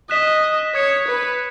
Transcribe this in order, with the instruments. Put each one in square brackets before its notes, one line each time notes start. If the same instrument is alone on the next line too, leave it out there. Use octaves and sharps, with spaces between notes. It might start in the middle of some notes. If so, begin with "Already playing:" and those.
[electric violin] D#5 [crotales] F#6 B6 E7
[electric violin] C#5 [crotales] D#6 G#6 C#7 E7
[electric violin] B4